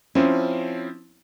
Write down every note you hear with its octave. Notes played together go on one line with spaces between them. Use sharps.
F3 C4 C#4 E4